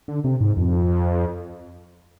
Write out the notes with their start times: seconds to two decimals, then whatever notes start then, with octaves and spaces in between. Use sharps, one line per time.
0.08 D3
0.24 C3
0.40 G#2
0.57 F2